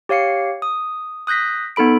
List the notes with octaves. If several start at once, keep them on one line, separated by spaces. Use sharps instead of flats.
G4 C#5 F5 C7 C#7
D#6
D#6 F#6 G6 A#6 B6
B3 D#4 A4 B5 D7